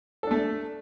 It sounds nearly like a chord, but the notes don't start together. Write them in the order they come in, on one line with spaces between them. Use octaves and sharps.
A4 D4 A3